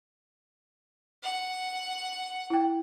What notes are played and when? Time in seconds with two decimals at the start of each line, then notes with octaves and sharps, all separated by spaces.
1.23 F#5
2.50 E4 G5